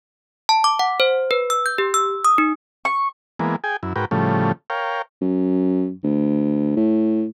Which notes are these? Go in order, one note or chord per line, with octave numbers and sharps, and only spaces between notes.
A5
D6
F#5
C5
B4
E6
G6
G4
E6
D#6
D#4
C#6
E3 G#3 A#3 B3
G#4 G5 G#5
F#2 E4
G#2 F#4 A#4 B4 G5
A2 C#3 F3 G3 A3
A#4 C#5 F5 G5
F#2
D2
A2